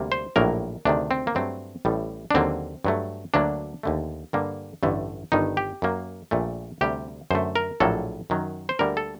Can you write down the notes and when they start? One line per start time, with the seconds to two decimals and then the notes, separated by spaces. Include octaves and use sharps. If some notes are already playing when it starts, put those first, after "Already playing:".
Already playing: D2 C3 G3 A#3
0.12 C5
0.36 A#1 A2 F#3 A#3 A#4
0.85 D2 C3 D#3 D4
1.11 C4
1.27 A#3
1.35 G2 F#3 A3 C4
1.85 A1 A2 G3
2.31 D4
2.34 D#2 D3 F#3 A#3 C4
2.85 G2 F#3 A3
3.34 D2 D3 F#3 A#3 D4
3.83 D#2 D3 A3
4.33 G2 D3 G3 A#3
4.83 A1 G2 D3 A3
5.32 G1 G2 D#3 D#4
5.57 G4
5.82 F#2 F#3 A#3
6.31 A#1 A#2 A3
6.81 D2 C3 G3 G4
7.31 F#2 D3 A3 C5
7.56 A#4
7.80 A#1 A2 F#3 A#3 A4
8.30 F#2 D#3 F#3
8.69 C5
8.79 D2 D3 G3 A#3 A#4
8.97 A4